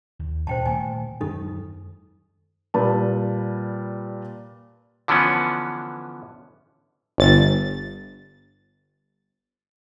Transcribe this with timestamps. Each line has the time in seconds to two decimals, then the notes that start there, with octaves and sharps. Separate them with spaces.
0.19 D#2
0.47 D#2 A#2 C5 G5 A5
0.66 A#2 D#3 A3 G#5
1.21 F#2 D#3 G#3 D#4 A4
2.74 A#2 G3 B4 A5
5.08 D3 E3 F3 B3 C#4
7.18 G1 A6